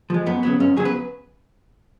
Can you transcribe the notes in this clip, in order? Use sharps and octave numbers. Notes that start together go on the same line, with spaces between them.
F3 G#3
F#2 B3
C#3 F#3 B3
F#2 C#4
C#3 F#3 B3 G#4
B4